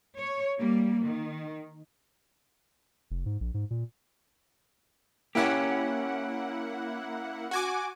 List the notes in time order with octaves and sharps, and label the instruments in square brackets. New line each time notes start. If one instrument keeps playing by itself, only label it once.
[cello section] C#5
G3 A#3
D#3
[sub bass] F1
G#2
A#1
G#2
A#2
[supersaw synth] A#3 E4 F#5 [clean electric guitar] C#4 G4
[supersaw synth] F#4 G#5 D6